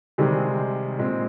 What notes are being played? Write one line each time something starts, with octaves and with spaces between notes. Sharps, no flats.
C3 D#3 G3 G#3 C4 G#4
A#2 G#3 C4